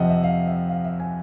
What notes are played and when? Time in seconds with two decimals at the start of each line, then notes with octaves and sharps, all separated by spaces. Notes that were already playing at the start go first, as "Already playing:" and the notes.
Already playing: F2 C3 F3 D#5 F#5
0.09 E5
0.24 F5
0.47 E5
0.70 F5
0.85 E5
1.00 G#5